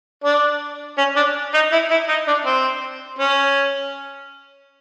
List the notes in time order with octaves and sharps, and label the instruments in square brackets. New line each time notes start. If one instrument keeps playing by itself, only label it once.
[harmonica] D4
C#4
D4
D#4
E4
E4
D#4
D4
C4
C#4